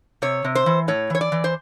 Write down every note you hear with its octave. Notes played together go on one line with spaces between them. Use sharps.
C3 C#5
C3
C5
E3
A2 C#5
E3 C#5
D5
E3
C5